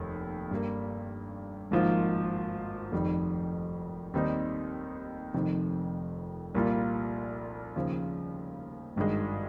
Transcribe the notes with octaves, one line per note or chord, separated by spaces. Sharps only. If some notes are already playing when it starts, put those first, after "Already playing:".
Already playing: F1 D#2 D#3
G2 G3 A#3
G#1 G#2 F3 A#3 F4
F1 F2 D#3 G3
D#2 D#3 G3 C4 D#4
F1 F2 C3 D#3
C2 A#2 G3 A#3 F4
D#2 C#3 F3
G#1 G2 D#3 G#3